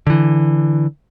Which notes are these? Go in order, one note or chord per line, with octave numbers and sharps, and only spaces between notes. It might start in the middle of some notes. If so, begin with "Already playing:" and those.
D3 E3